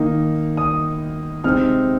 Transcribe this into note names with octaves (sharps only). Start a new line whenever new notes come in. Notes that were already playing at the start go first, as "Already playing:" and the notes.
Already playing: D#3 A#3 D#4
D#6
C3 G#3 C4 D#4 F6